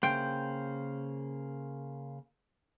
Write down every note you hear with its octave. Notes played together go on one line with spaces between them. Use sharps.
C#3 A#3 C5 G5